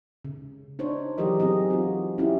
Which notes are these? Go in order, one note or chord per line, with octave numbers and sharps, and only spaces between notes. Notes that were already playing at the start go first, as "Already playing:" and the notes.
C#3
D4 D#4 C5 C#5
E3 F#3 G4 G#4 A#4 D#5
F#3 C4 D#4 G#4 D#5
F4 F#4
C#4 E4 G4